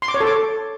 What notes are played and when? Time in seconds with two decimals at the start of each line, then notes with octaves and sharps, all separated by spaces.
0.02 C6
0.08 D6
0.14 C#5
0.21 A4
0.27 D6